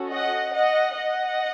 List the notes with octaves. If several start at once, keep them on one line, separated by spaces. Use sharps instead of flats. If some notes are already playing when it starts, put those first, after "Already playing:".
Already playing: C#4 F#4 A4
D#5 F#5
D#5 F#5
D#5 F#5